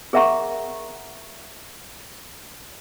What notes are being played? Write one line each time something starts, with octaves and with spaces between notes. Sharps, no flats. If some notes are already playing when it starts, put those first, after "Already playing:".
G#4 A#4 E5 F#5 A#5 C#6